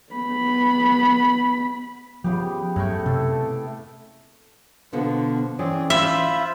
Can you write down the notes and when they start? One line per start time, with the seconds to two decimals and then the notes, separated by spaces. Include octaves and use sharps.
0.13 B3 B5
2.24 C#3 F3 B3 G4
2.76 F#2 A2 G5 C#6
3.06 C3 A4
4.93 B2 D3 F3 B3
5.59 E3 C4 C#4 G#4 D5
5.90 F4 C5 E5 B5